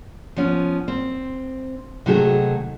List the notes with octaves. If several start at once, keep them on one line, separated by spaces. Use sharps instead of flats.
F3 B3 C#4
C4
C3 D#3 F#3 A3 F#4 G#4